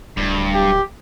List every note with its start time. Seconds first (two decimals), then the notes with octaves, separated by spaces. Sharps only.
0.17 D1 G2
0.54 G4